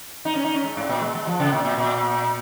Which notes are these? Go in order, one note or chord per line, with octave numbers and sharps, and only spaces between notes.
D#4
C#4
D#4
C#4
G#3
G#2
A#2
G#3
G#3
F3
C#3
A#2
A#2
A#2